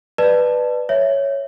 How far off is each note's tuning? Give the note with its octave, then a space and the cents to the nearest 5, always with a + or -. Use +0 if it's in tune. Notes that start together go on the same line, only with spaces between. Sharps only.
B4 +0 D5 +25 A5 +0
C#5 +0 E5 +0